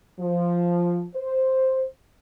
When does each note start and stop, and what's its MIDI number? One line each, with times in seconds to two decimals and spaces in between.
0.20 1.04 53
1.15 1.85 72